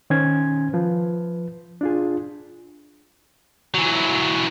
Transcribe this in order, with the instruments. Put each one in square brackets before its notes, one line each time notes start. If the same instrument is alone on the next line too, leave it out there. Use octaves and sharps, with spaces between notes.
[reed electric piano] D#3 C#4 C5 G#5 G#6
F3 B4
D4 F4 G#4
[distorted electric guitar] E3 F#3